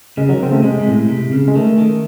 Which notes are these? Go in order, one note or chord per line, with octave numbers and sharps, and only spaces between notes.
C#3 G#3
D#3 F#3
C#3 C4
A3
C3 G#3
C3
A2
C3
C#3
G#3
D#3 A3
D#3